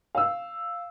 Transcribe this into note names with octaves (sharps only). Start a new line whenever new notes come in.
F5 E6